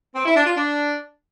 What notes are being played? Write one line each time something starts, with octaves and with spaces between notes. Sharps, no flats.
C4
E4
D4
F4
D4